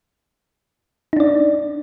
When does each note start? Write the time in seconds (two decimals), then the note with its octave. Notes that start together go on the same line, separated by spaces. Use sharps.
1.13 D#4
1.17 D4
1.20 D5